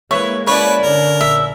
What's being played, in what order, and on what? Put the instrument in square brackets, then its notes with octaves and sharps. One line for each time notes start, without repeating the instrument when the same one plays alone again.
[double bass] G#3 A#3 [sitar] E4 B4 E5 [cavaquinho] C#5
[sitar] C#3 E4 D5 [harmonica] B4 [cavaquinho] C#5
[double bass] D3 D4 [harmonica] A#4
[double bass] A#1 [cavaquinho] E5